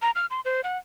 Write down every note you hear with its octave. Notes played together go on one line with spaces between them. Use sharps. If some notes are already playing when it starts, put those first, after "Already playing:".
A#5
F6
C6
C5
F#5